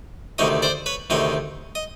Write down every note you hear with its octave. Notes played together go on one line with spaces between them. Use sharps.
D2 C3 D#3 C#5 D#5
C5 D5
B4 C#5
D2 C3 D#3 C#5 D#5
D#5